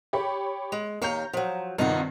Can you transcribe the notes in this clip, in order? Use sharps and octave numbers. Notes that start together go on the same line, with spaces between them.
G4 C#5 B5
G#3
D#2 C#5 F5 A#5 G6
F3 F#3
G2 C3 D#3 D#4 F4 F#4